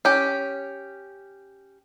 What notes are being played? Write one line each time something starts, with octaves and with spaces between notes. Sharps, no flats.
C#4 G4